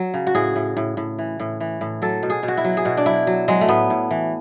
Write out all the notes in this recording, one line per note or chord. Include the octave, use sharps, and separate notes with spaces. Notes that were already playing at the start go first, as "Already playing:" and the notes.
Already playing: F#3
C#3
F#4
A2 G#4
A2
A2
A2
E3
A2
E3
A2
F#3 A4
B2
G#4
B2
F#4
E4
F#3
G#4
B2 F#4
D4
F#3 E4
F#3
F#3 G#3
A3
A2 B3
A2
E3